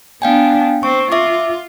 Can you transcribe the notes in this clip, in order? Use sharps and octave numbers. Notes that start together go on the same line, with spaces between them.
B3 D4 F5 G5 G#5
C4 C#6
F4 E5 D6